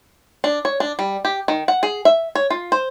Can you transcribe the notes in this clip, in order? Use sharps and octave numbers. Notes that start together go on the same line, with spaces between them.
D4
C#5
D4
G3
G4
D#3
F#5
G#4
E5
C#5
F4
C5